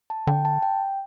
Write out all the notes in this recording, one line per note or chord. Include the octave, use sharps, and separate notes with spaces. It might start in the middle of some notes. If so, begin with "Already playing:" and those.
A5
D3 G5
A5
G5